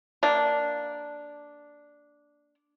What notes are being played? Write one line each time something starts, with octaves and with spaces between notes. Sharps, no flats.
A#3 D4